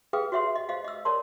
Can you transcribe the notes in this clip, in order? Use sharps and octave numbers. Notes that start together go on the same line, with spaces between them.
G#4 B4 F5 G5 D#6
F#4 C#5 E5 F#5 C6
D#5
C5 D#5 F5
D#5 E6
A#4 C#5 D5 A5 C6